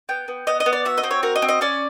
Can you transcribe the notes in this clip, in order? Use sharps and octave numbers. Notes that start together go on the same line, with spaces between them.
B3 G5
B3
B3 D#5
D#5
B3
D5
F#4 E5
D#5
C4
C#5
F#4 A#4
D#5
C4
D#5
C#4 D5